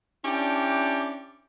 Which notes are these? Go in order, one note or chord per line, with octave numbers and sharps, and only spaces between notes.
C#4 D4 E4 G4 D5 G5